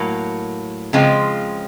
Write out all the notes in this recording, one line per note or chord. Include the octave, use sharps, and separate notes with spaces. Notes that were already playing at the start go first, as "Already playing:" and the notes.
Already playing: A2 F#3 A#3
C#3 F3 G#3 C4 F4